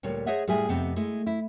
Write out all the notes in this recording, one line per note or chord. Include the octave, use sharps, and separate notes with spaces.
D2 A#2 G3 C#5
G#4 C5 C#5 D#5 E5 F#5
A2 G3 G#4 E5 G#5
F2 C3 B3 C4
G#3 A3 E4
E4